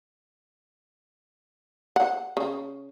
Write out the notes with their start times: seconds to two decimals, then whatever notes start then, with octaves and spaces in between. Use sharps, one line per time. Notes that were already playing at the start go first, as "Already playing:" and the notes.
1.96 F#5
2.37 C#3